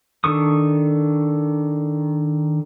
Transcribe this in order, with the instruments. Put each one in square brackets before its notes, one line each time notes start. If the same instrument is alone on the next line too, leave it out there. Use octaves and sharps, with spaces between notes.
[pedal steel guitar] D#3 D4 A4 C#6 D#6